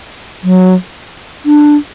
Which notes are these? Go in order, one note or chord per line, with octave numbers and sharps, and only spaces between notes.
F#3
D4